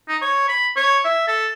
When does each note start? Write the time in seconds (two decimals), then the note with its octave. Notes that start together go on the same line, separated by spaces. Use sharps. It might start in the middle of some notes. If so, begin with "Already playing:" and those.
0.08 D#4
0.22 C#5
0.49 B5
0.76 C#5
1.05 E5
1.28 A4